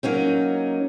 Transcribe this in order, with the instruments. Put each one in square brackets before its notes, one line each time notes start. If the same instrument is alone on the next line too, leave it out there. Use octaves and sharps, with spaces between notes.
[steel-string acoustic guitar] F#3 A#3 C#4 D#4